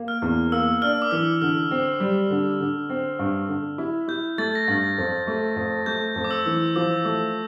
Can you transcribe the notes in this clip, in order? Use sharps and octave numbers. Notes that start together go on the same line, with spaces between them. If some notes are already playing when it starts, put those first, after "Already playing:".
Already playing: A#3
F6
E2
A#3 E6
D4 F6
D6
E3 E6
D3 F6
C4
G3
D3
D3
C4
G2
D3
E4
E4 G6
A3 A6
A#6
G2 A6
F2
A3
F2
A3 G6
F2
D6
E6
E3
F3 D6
A3